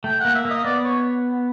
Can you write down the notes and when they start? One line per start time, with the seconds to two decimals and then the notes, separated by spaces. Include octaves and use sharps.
0.04 A3 G5
0.20 A#3 F#5
0.35 E5
0.45 A#3 D#5
0.65 B3 D5
0.84 C#5